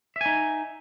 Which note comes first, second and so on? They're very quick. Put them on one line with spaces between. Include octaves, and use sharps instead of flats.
E5 G#5 D#4